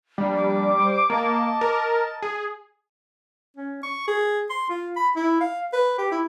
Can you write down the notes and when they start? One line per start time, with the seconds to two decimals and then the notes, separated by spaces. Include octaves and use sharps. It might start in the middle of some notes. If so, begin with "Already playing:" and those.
0.18 F3 G3 A#3 D4
0.36 D6
0.76 C5
1.10 A#3 D#5 A5
1.61 A#4
2.22 G#4
3.57 C#4
3.83 C#6
4.08 G#4
4.50 C6
4.69 F4
4.97 B5
5.16 E4
5.41 F5
5.73 B4
5.98 G4
6.12 E4